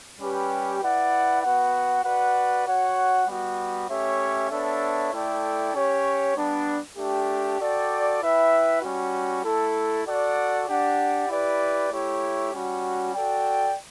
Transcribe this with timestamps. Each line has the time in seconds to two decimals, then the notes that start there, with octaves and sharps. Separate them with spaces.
0.20 G3 C#4 G4 B4
0.81 E4 B4 D5 F#5
1.43 B3 F#4 B4 F#5
2.04 F#4 B4 D5 F#5
2.66 F#4 C#5 F#5
3.27 G3 B3 F#4
3.89 A3 C#4 G4 C#5 E5
4.51 B3 D4 A4 C#5 E5
5.12 A3 E4 A4 D5 G5
5.74 C#4 G4 C#5
6.36 G3 B3 D4
6.97 A3 D4 G4
7.59 F#4 A4 D5 G5
8.21 E4 B4 E5 G5
8.82 G3 C#4 F#4
9.45 A3 E4 A4
10.05 F#4 A4 D5 F#5
10.68 D4 G4 D5 F#5
11.29 E4 G4 B4 D5
11.91 A3 E4 G4 C#5
12.53 G3 C#4 F#4
13.14 F#4 A4 D5 G5